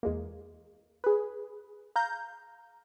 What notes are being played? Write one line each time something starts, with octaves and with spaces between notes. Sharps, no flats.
E2 G#3 A#3
G#4 B4
F5 A#5 G6